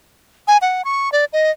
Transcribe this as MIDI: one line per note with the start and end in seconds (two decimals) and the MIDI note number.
0.48 0.57 80
0.62 0.82 78
0.85 1.09 85
1.12 1.25 74
1.33 1.51 75